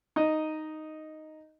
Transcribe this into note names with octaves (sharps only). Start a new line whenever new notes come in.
D#4 D#5